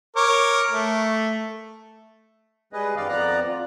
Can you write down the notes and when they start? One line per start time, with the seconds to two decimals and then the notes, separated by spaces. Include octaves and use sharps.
0.16 A#4 C#5 D6
0.70 A3
2.73 G3 G#3 G#4 B4 D#5
2.96 F#2 D#3 B4 D5 F5
3.09 F2 F3 B3 D5 A#5 F#6
3.47 F4